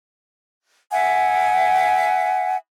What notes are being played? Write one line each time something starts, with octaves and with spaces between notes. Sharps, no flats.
E5 F#5 G#5